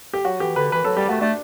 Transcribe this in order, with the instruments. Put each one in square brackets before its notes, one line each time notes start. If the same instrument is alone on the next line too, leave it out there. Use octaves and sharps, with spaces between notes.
[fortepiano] G4
[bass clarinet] F#3 [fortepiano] F#4
[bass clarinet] E3 [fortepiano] G4
[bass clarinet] D3 [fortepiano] B4
[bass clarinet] E3 [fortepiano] B4
[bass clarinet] F#3 [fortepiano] A4
[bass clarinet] G3 [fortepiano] G4
[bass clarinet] A3 [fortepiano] F#4
[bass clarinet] A3 [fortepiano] D4